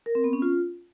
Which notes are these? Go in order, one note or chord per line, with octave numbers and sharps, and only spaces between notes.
A#4
C4
B3
C#4
F4